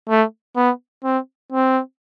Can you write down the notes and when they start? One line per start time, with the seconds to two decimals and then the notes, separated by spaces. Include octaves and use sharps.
0.09 A3
0.56 B3
1.04 C4
1.52 C4